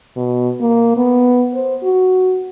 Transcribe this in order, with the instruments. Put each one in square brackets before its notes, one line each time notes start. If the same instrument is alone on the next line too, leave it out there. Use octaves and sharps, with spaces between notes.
[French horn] B2
A#3
B3
C5
F#4